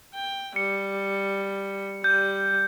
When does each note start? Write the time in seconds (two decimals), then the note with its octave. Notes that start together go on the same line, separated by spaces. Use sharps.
0.14 G5
0.56 G3 C#7
2.04 G3 G6